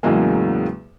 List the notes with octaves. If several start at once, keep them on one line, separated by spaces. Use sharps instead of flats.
E2 A2 C#3 F#3 G#3 A#3